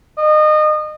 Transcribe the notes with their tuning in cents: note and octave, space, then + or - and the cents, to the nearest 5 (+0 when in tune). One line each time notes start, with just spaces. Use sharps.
D#5 -30